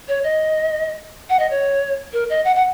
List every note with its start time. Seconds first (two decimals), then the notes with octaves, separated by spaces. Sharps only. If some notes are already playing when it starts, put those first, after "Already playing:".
0.08 C#5
0.24 D#5
1.30 F#5
1.39 D#5
1.50 C#5
2.13 A#4
2.30 D#5
2.45 F#5
2.56 F#5